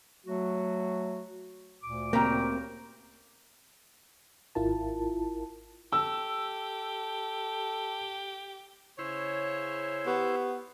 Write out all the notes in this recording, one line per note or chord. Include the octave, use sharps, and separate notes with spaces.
F#3 A3 F#4
D2 A#2 D6
C#3 A#3 C4 G4 A#5
G#1 E4 F4 A#4 A5
G4 A4 E6
C#3 E4 C5 C#5
B3 G4 C#6